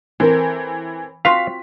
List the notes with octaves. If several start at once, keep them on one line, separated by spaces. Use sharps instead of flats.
E3 C4 A4 A#4
C4 F4 F#4 F5 B6